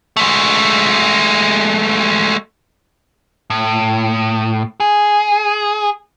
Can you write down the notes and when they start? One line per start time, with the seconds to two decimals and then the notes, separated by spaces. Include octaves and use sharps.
0.17 G#3 A3
3.50 A2
4.80 G#4